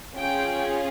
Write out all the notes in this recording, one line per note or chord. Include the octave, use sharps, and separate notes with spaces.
C#4 F4 G#4 G5